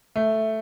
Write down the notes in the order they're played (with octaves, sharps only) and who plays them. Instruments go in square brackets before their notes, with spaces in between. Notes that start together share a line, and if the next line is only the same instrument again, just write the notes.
[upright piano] A3